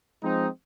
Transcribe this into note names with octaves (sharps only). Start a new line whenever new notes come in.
F3 G#3 C4 D#4